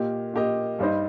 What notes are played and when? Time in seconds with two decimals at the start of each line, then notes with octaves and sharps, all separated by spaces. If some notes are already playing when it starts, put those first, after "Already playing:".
Already playing: A#2 A#3 G4 D#5
0.33 A#2 A#3 G4 D#5
0.79 G2 G3 D#4 C5 D#5